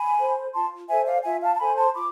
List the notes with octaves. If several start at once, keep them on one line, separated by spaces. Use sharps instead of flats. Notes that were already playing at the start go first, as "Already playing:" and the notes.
Already playing: G#5 B5
A4 C5
F4 A5 C6
A4 C5 E5 G#5
D5 F5
F4 E5 G#5
F5 A5
A5
A4 C5 G#5 B5
A5 C6
F4 B5 D6